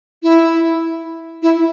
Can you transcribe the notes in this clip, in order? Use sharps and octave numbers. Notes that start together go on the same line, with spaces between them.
E4
E4